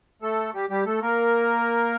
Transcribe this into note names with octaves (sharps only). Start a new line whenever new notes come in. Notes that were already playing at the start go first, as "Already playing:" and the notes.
A3 A4
G3 G4
G3 G4
A3 A4
A#3 A#4